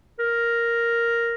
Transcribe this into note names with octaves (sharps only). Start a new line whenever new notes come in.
A#4